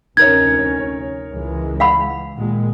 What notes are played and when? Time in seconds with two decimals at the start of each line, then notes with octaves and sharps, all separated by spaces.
0.17 F1 D2 C#4 D#4 A#4 C#5 G#6
1.33 C#2 E3 G#3
1.80 F5 F#5 B5
2.37 A#2 D#3 G#3